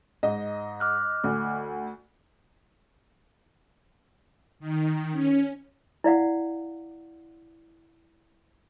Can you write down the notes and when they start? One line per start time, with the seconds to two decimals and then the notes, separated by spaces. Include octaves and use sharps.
0.23 G#2 D#5
0.80 D6 F6 F#6
1.24 D2
4.60 D#3
5.12 C#4
6.04 E4 D5 F5 F#5